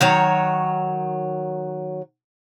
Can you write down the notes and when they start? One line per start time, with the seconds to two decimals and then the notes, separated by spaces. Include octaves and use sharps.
0.01 D#3 F#3 C#5